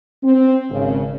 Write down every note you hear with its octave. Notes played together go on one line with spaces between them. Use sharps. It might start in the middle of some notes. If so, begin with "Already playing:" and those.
C4
G#1 C#3